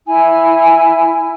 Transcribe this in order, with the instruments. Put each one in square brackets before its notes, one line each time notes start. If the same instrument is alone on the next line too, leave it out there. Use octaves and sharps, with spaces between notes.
[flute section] E4 G#5